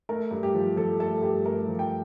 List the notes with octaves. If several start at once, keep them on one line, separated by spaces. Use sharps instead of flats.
A3 A#4
G2
G4
F3
F3 A4
A3 A4
G2 G4
A3 A#4
F3
G5